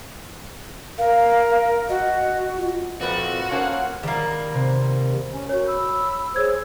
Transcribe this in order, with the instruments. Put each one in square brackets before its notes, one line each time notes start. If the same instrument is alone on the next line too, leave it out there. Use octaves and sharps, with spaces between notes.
[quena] A#4 [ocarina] F5
[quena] F#4 [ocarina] D#5
[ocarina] F4
[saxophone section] F2 [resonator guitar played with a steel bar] A#2 B4 D5 [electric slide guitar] F#4
[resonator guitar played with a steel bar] A#3 C#4 C5 [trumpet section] F4 F5 F#5 [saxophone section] A4 C#5
[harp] D#3 A#4 [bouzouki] G3 A#3
[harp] C3 C4
[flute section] C#4 G#5
[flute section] F#4 A#4 G6 [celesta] C#5
[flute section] B5 E6
[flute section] G#4 C5 C#5 [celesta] E6 G#6